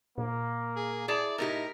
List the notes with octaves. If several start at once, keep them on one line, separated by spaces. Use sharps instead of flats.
A#2 A#3
G#4
E4 G#4 D5 A5
A2 D#4 G4 A#4